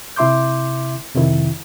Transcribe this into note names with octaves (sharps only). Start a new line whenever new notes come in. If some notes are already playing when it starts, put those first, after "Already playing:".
C3 E4 E5 C6 D6 G6
F2 C3 D#3 E4